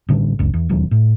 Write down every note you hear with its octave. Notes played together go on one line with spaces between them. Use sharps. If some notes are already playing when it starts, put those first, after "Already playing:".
A1 D3 G3
F#1 C#2
E2
E1 D#2 F#3
A2